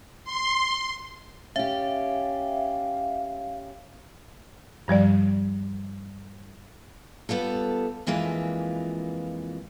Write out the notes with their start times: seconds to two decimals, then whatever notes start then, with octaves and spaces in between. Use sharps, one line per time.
0.24 C6
1.56 C#4 G4 E5 F5
4.88 G2 F3 G3 D5
7.29 G3 B3 F4 A4
8.07 F2 E3 G#3 A#3 F4 B4